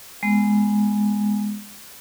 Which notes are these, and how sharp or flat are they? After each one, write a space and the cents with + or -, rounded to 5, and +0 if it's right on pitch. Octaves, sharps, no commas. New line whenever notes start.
G#3 +0 B3 +0